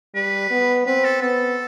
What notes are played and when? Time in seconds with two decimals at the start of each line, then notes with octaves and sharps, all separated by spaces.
0.15 G3 B4
0.51 B3
0.86 C4 B4
1.04 A4
1.22 B3 A4